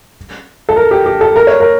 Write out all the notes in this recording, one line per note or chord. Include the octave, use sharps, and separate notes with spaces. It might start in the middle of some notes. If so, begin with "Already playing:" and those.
A4
A#4
G4
G4
A4
A#4
C#5
A#4